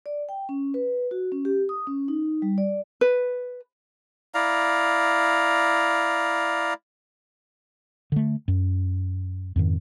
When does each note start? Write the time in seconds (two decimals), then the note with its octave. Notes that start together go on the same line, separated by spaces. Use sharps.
0.06 D5
0.29 G5
0.49 C#4
0.74 B4
1.11 F#4
1.32 C#4
1.45 G4
1.69 D#6
1.87 C#4
2.08 D#4
2.42 G3
2.58 D5
3.01 B4
4.34 E4 D5 F5 A#5
8.12 D3 A3
8.48 F#2
9.56 F2 G#2 D#3